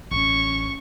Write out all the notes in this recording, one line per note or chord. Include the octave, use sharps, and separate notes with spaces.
A1 C#4 C#6